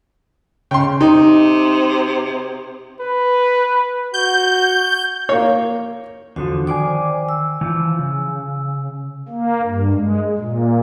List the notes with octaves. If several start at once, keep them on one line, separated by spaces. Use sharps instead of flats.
C#3 G5 C6
C3 D#4
B4
F#4 G6
A#3 C#5
E2 D3 F3 F#4
D#3 C5 D5 G#5 D6
E6
E3 F3
C#3
A#3
G2
G#3
A#2